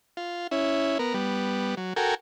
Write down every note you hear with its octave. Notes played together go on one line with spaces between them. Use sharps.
F4
C#4 E4
B3 A#4
G3 B3
F#3
F#4 A4 A#4 G5 G#5